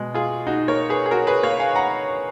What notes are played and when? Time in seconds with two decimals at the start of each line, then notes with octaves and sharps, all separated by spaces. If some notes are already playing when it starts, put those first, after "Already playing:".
Already playing: B2 G#3
0.14 F4 G#4
0.47 D#4 F#4
0.68 A#4 C#5
0.89 G#4 B4
1.06 G#4
1.11 F#4 A#4
1.27 G#4 B4
1.43 C#5 F5
1.60 F5 G#5
1.76 F#5 A#5